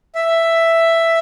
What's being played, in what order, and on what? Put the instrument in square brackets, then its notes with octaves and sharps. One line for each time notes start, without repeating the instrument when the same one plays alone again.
[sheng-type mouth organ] E5